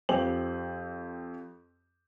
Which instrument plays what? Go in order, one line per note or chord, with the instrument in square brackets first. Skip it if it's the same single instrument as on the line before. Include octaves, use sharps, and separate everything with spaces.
[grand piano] F2 G4 C5 F#7